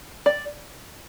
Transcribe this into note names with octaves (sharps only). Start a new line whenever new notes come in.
D5